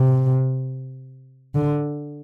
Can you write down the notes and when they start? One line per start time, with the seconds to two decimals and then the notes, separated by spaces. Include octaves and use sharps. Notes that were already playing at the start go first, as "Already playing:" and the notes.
Already playing: C3
1.55 D3